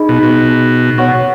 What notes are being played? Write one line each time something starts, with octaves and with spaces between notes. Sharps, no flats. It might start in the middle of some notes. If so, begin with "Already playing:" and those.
Already playing: D#4 G#4 D#5 B5
B2
B2
B2 C#5 F#5 C#6